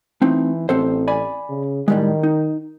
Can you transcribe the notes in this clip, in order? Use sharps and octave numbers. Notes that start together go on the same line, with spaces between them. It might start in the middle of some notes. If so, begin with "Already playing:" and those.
E3 A3 C4 D#4
A1 C4 A4 C5
D5 G#5 B5
C#3
A2 D#3 G3 G#3
D#4